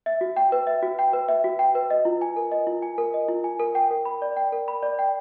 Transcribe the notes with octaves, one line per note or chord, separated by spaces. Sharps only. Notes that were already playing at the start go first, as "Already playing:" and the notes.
E5
F#4
G5
B4
E5
F#4
G5
B4
E5
F#4
G5
B4
D#5
F4
G#5
A#4
D#5
F4
G#5
A#4
D#5
F4
G#5
A#4
G5
A#4
B5
D5
G5
A#4
B5
D5
G5